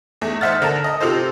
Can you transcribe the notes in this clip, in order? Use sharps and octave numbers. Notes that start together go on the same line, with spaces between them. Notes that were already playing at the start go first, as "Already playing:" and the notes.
E2 A3
C5 D#5 E5 F#5 F6 A6
D3 A#4 A5
D#5
C3 F4 A4 C5